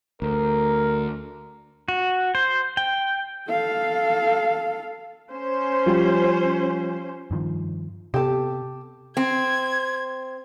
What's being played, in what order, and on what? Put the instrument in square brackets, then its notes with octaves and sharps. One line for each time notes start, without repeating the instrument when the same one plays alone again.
[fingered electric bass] D2 [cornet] A#4
[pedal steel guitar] F#4
C5
G5
[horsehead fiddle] A4 F5
[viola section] C#4 C5
[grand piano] F3 G3 F4
[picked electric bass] G2 D#3 F3
[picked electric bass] C3 B3 [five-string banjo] G4 A4
[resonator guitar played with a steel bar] C4 [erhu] G#6